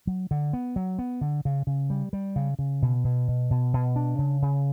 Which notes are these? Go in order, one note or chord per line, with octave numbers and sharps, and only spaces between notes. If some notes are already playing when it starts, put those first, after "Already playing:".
F#3
D3
B3
F#3
B3
D3
C#3
C#3
G3
G3
C#3
C#3
B2
B2
B2
B2
B2
D4
C#3
C#3